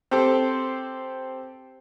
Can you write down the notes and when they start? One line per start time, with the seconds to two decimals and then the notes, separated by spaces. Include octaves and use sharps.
0.11 C4 G4 A4 C5